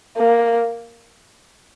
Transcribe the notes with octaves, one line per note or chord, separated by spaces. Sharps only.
A#3